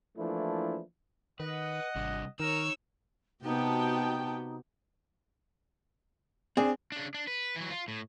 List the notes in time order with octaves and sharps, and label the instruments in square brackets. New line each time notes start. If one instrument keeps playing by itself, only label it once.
[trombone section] E3 F3 A3 A#3 D4 E4
[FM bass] D#3 [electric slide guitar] B4 [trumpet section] D#5 F#5
[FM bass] G#1 [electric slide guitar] C3 G3 D4
[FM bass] D#3 [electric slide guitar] D#4 [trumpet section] A#4 [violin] C#5 E6
[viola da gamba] C3 B3 [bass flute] D#4 [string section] F#4 G5 A5
[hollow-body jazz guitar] C4 [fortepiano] D4 G#4
[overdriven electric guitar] C#3 D4
D4
B4
E3 F#3
F4
A2